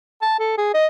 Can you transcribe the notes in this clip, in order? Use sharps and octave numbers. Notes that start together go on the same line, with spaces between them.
A5
A4
G#4
D#5